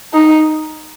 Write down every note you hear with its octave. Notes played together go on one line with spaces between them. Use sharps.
D#4